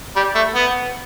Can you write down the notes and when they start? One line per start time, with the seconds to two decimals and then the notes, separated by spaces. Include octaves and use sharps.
0.16 G3
0.35 A3
0.55 B3